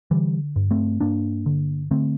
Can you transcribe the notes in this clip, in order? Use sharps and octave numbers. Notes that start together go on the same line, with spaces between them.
D3 E3 G3
G2
A3 C4
G2 A#3 D4
D3
D3 A3 C4